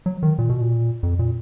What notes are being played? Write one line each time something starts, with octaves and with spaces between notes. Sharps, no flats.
F#3
D#3
A#2
B2
A#2
F2
A#2